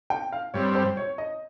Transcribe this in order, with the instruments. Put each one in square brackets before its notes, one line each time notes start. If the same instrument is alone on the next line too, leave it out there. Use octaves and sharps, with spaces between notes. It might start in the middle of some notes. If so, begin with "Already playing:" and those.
[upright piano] G5
F5
[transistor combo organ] G2 G3 C4 [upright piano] C#5
[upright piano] C5
C#5
D#5